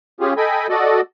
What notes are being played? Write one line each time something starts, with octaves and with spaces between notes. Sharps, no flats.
C#4 F4 G4 G#4
A4 D#5 G5 G#5 B5
F#4 A4 D5 D#5